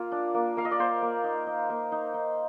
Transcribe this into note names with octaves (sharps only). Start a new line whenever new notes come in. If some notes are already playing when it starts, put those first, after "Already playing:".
Already playing: A#3 F4
D4
A#3
A#3 F5
D#5
D5
A#3 C5
A#3
D#4
D#4
A#3
D#4
D#4